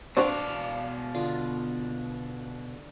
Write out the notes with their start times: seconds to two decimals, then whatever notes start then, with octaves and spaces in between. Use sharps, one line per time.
0.17 B2 C4 D4 F#4 C5 F5
1.14 D3 F4